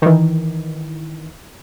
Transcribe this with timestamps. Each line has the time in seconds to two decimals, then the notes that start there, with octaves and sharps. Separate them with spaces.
0.02 D#3 E3